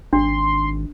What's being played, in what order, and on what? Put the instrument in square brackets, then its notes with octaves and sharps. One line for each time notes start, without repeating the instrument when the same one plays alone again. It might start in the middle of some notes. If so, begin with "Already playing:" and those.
[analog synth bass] G#1 [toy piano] D4 [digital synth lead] C6